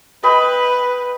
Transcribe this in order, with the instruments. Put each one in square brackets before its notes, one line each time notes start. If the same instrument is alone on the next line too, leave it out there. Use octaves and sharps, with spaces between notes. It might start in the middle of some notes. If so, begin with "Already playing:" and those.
[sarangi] B4 [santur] D#5 G5 B5